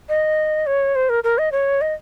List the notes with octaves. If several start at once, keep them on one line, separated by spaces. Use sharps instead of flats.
D#5
C#5
C5
A#4
A#4
D#5
C#5
D#5